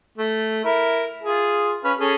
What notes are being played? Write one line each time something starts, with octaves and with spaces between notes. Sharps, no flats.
A3
E4 A#4
F4 G#4
C#4 B4 F5
C#4 G#4 A4